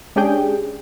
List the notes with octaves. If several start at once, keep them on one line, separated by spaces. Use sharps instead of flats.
G#3 C#4 D4 G4 G#4 G5